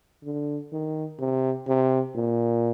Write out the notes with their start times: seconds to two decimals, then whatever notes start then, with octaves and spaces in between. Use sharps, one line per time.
0.24 D3
0.72 D#3
1.19 C3
1.67 C3
2.15 A#2